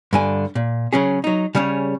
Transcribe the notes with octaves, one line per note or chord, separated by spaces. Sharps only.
G2 D3 G#5
A#2
C#3 F#3 C#4 G#4
F#3 D#4
C#3 G3 C#4 G#4 C#5